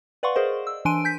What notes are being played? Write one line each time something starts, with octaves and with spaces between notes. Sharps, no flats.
B4 D5 F5 F#5 C6 C#6
G#4 A#4 C5 D#5
E6
E3 D4 G#5 C6 D7 D#7
G#5 G6 B6